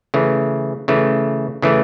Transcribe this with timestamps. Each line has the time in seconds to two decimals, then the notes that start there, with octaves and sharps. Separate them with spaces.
0.14 C#3 E3 A3
0.88 C#3 E3 A3
1.62 C#3 E3 A3